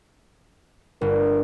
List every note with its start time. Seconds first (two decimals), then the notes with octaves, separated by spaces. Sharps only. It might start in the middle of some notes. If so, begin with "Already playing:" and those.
1.01 G1 A#4